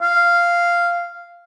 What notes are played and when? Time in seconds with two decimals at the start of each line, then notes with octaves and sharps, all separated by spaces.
0.01 F5